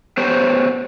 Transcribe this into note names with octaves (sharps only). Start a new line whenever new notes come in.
B3 G4 C5 C#5 G5